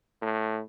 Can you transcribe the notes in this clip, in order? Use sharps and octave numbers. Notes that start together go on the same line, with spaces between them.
A2